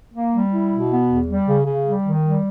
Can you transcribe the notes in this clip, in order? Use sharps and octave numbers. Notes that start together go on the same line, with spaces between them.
A#3
G3
E4
B2
B3
E2
G3
C#3
C#3
G3
D#3
G3